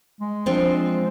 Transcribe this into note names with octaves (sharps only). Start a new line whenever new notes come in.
G#3
F3 C4 D4